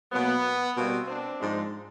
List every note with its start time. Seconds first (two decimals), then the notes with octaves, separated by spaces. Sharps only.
0.12 B2 F#3 A#3 B3
0.75 B2 G3 A#3 C4
1.08 C4 D4
1.39 G#2 F3 G#3